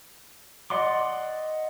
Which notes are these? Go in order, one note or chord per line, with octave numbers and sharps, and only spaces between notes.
D5 D#5 F#5 C6 D6